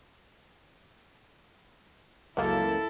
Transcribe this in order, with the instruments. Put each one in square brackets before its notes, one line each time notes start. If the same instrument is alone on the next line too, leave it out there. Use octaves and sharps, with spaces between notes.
[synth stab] C#2 F#2 A#3 [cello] E4 A4